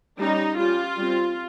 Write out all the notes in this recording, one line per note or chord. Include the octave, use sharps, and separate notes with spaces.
G3 C#4 D#4
G3 C#4 F4
G3 C4